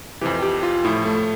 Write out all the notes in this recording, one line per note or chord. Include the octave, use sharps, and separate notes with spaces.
F2 C3 E3 G4
G4
F4
A2 F3 E4
A3